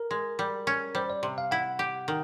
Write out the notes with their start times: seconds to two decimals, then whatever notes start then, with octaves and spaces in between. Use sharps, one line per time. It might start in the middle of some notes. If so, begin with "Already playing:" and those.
Already playing: A#4
0.11 G#3
0.39 G3
0.67 C#4
0.95 G3 C5
1.10 D5
1.23 C3
1.38 F5
1.51 E4 F#5
1.79 G4
2.08 D#3